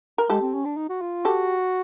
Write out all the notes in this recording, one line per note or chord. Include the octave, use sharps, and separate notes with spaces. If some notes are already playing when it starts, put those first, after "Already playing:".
A#4
G#3 G4 A4
C4
C#4
D4
D#4
F#4
F4
F#4 G4 A4